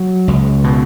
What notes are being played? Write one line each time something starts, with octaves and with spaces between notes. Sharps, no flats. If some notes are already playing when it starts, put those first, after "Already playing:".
Already playing: F#3
C#2
B2